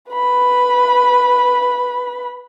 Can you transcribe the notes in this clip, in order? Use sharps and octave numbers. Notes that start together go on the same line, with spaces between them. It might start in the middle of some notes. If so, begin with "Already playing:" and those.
B4 B5